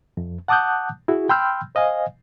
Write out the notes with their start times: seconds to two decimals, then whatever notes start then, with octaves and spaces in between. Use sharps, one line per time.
0.17 F2
0.48 F#5 A5 D6 D#6 F#6 G6
1.08 E4 F#4 G#4
1.29 G5 B5 C6 E6 F6 G6
1.75 C5 D#5 F5 G#5